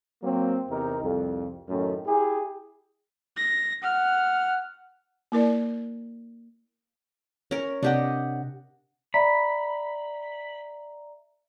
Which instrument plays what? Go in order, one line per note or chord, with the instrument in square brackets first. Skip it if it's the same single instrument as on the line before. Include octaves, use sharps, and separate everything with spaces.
[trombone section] F#3 A#3 C4
E2 C3 D#4 A#4
C2 F2
F#2 A2 D#3 C#4
E4 G4 G#4
[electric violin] A#6
[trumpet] F#5 [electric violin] F6
[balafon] A#3 E4 A#4 D5
[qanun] C#4 A#4
[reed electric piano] C3 F#5 [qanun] D4 G4 D#5
[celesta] D5 E5 A#5 [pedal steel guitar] B5